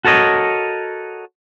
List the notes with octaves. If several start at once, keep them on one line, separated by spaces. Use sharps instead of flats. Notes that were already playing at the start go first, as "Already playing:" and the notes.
F#4 A4 A#4 C#5 D#5